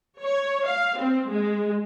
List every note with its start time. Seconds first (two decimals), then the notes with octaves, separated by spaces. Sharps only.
0.22 C#5
0.65 F5
0.97 C4
1.29 G#3